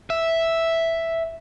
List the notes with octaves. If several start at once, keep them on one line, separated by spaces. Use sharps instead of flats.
E5